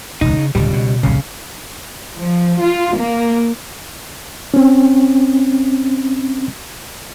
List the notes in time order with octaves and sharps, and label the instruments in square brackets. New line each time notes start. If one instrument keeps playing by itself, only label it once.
[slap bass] E1 C#2 [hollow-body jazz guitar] D#4
[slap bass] C#3
[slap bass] D1 B2 [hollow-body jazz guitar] C#2 G3
[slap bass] B2
[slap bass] D#1 C2 F#2 [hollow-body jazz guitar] C#3
[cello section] F3
F4
A#3
[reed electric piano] C4 C#4